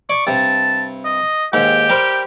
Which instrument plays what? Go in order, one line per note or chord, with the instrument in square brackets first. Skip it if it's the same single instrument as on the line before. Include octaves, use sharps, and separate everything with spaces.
[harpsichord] D5 [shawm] C#6
[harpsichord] G2 C3 [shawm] A5
[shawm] D#5
[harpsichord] D#2 G#2 [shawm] G4
[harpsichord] G3 A#4 C5